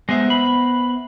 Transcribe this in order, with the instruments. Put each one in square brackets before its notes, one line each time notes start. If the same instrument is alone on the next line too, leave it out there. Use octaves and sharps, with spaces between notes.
[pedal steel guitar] G#3 [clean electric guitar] B3 C5 E5
[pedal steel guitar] B5